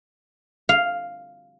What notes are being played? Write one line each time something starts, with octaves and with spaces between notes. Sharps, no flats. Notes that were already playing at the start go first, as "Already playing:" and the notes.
F5